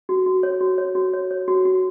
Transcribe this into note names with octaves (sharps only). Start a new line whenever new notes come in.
F#4
F#4
C#5
F#4
C#5
F#4
C#5
C#5
F#4
F#4